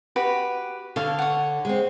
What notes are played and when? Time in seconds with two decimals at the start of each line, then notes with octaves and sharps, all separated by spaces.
0.16 F#4 G4 B4
0.96 D3 A4 C#5 F5
1.19 C#5 F#5
1.65 G#3 C4